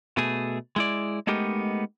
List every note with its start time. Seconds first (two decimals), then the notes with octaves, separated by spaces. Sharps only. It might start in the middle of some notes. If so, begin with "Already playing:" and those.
0.17 B2 A3 G#4
0.76 G#3 E4 D5
1.27 G#3 A3 B3 D#4 G4 A#4